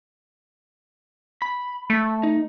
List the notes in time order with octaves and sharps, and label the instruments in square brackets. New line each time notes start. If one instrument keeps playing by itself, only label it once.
[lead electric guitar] B5
[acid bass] A3
[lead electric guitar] D#4